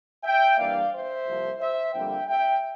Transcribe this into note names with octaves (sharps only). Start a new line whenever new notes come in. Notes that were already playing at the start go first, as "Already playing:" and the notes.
E5 G5
G2 E3 A#3 D5 F5
C5 E5
C2 C3 F3 A#3
C5 E5
F2 D3 G3 A#3 E5 G5
E5 G5